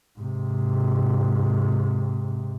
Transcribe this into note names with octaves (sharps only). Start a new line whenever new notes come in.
G#2 C3